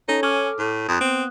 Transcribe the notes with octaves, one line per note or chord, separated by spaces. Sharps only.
C#4 D#4 A4 C#5
C#4 A4 D6 F6
A2
F2 D#6 F#6
B3 C4